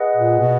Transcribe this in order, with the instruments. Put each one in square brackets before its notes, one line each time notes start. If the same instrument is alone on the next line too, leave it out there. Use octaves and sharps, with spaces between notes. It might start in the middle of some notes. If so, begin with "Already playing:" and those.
Already playing: [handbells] G#4 B4 D#5 F#5
[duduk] A#2
B2